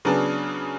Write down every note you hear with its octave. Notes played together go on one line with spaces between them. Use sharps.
C#3 F#3 B3 D4 G#4